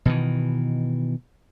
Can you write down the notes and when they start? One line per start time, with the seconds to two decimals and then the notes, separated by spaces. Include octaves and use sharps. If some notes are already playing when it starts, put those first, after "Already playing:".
0.05 B2 D#3 E3